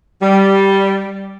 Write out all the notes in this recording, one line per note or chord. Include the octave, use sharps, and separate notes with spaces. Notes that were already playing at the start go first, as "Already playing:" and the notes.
G3